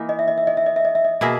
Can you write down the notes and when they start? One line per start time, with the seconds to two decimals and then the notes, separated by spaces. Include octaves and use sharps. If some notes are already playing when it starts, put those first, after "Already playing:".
Already playing: E3 A#3 D#4
0.09 D#5
0.19 E5
0.28 D#5
0.38 E5
0.47 D#5
0.57 E5
0.66 D#5
0.76 E5
0.85 D#5
0.95 E5
1.05 D#5
1.21 B2 A#3 E4 G#4